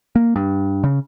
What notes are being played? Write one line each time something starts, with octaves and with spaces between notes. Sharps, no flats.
A#3
G2
C#3